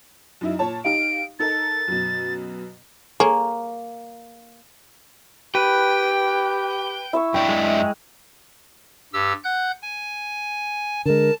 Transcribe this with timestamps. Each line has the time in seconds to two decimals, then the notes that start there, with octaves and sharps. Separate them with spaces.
0.41 F#2 D#4 E4
0.59 A#2 C#5 A5
0.84 D#4 G4 F5 D7
1.39 D#4 A4 A#4 A6
1.88 F#2 B2
3.20 A#3 G#4 C#5
5.55 G4 B4 G5
7.13 E4 E5 C#6
7.34 F#2 D4 E4 G5
7.49 G#3
9.13 G2 G4 E6
9.44 F#5 F#6 G6
9.82 G#5
11.06 D3 G#3 A#4 A5